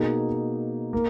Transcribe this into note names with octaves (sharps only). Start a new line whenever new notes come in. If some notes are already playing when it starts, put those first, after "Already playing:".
Already playing: B2 A#3 D#4 G#4
A#3